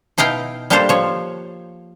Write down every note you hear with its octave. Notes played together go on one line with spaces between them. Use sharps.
B2 D#4 E4 F5 G5
G3 A#3 D4 G4 A4 C5
F3 C#5